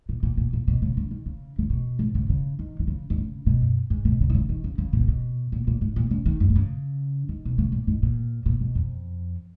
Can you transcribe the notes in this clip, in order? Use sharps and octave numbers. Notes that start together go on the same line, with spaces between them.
A#2
A#2
A#2
A#2
B2
C#3
C#3
D#3
C#3
C#3
B2
G#2
C#3
C#3
D#3
D#3
C#3
D#3
C#3
B2
F#2
G#2
B2
C#3
D#3
C#3
D#3
C#3
C#3
A#2
C#3
B2
A#2
A#2
G#2
A#2
C#3
D#3
F#2
B2
C#3
D#3
B2
C#3
A#2
G#2
A#2
A#2
B2
F2